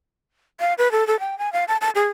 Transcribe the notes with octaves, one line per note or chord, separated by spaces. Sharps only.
F5
B4
A4
A4
G5
G#5
F5
A5
A5
G#4